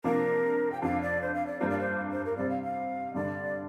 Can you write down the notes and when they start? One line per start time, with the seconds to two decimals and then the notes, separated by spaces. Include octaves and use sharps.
0.04 C3 F3 A#3 D4 A#4
0.72 G5
0.82 F2 F3 D4 F4 F5
1.01 D5
1.22 C5
1.34 F5
1.46 D5
1.60 G2 G3 A#3 D4 F4 C5
1.69 D5
1.79 C5
2.11 C5
2.25 A#4
2.37 C3 G3 C4 D5
2.50 F5
2.63 F5
3.14 G2 D3 G3 D4 D5